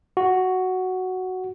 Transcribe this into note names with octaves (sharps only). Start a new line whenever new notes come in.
F#4